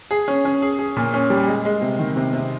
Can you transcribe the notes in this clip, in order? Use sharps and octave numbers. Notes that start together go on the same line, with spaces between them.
G#4
C#4
C#4
G#4
G#4
A#2
C#4
G3
G#3
G#3
C3
D#3
C3
C3